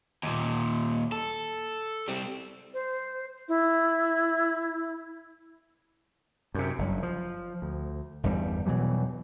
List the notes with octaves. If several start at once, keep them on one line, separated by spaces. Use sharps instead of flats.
D#2 A#2
A4
G3 C4
C5
E4
F#2 C3
F#1 G2
F3
D2
G1 E2 D3 G3
B2 E3 F#3 G3